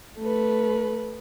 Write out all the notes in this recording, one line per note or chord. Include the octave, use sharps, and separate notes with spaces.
A3 B4